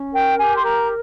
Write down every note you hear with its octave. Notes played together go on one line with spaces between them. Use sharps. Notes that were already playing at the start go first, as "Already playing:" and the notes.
Already playing: C#4
A#4 G5
G4 G#5
C6
A#4 A#5